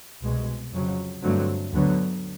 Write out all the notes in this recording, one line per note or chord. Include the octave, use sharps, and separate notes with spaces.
C2 B2 G#3
F2 C#3 F#3
G2 D3 F#3 A3 C4
D2 D3 F#3 B3